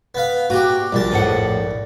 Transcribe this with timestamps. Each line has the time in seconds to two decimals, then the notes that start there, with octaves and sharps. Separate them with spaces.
0.15 B3 F5
0.50 A#2 F#4 G4
0.92 A#1 A#2 G3 A5
1.12 F2 A2 F#5